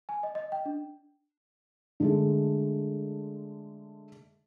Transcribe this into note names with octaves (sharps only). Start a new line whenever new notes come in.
G#5
D#5
D#5
G5
D4
D3 G#3 A3